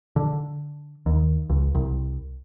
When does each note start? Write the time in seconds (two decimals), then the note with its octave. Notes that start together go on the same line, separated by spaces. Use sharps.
0.16 D3
1.06 D#2
1.50 C#2
1.75 C2